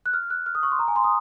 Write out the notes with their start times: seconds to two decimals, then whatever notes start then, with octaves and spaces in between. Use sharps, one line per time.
0.06 F#6
0.13 F6
0.30 F#6
0.46 F6
0.55 D#6
0.63 C#6
0.72 C6
0.79 A#5
0.88 G#5
0.96 C6
1.04 D#6